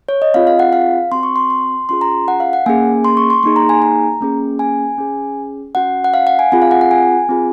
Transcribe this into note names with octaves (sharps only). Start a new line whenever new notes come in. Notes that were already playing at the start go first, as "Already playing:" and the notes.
C#5
D#5
C4 F4 G#4 F5
F5
F#5
F5
C4 F#4 C6
C#6
C6
C6
C#4 F4 G#4 C6
A#5
F#5
F5
F#5
A#3 C#4 G#4 G#5
C6
C#6
C6
A#3 D#4 G#4 C6
A#5
G#5
A#5
A#3 C#4 G#4
G#5
C#4 G#4
C#4 F#4 F#5
F#5
F5
F#5
G#5
C4 F4 G#4 G#5
F5
F#5
F#5
G#5
C4 F4 G#4